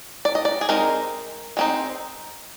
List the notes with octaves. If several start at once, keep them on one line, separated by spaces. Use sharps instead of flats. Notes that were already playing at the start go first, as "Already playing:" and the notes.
D5
D#5
D5
G#4
G#3 C4 D#4 A#4
G#3 C4 D#4